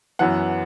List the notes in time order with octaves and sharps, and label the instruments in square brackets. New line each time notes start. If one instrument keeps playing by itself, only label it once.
[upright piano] F#2 E3 B3 F#5